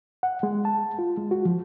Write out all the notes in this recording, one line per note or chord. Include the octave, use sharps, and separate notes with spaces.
F#5
G#3
A5
F4
G#3
F#4
F3